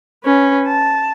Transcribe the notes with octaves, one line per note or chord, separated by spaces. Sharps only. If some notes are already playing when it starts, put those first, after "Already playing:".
C#4 B4
A5